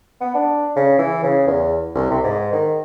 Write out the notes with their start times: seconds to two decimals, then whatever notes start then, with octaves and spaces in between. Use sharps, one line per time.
0.21 B3
0.35 D4
0.76 C#3
0.99 E3
1.23 C#3
1.47 E2
1.95 C2
2.11 C3
2.24 G#2
2.53 D#3